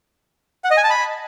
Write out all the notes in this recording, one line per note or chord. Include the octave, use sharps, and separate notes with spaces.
F#5
D#5
G#5
A5
B5